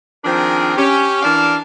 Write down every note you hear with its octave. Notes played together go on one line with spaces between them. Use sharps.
D#3 F3 C4 D4 G#4 A#4
C#4 G4
E3 D4 A#4 D5 F5 A5